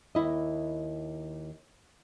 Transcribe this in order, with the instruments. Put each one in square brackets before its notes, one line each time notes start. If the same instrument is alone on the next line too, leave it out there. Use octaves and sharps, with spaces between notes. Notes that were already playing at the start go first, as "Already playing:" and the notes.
[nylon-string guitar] D#2 E4 D#5